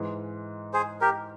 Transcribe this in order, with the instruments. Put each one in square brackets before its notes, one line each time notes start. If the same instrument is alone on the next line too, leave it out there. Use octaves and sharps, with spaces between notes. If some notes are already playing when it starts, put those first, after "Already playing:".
Already playing: [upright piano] G#2 E3 G#3
[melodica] G#4 C5
G4 A#4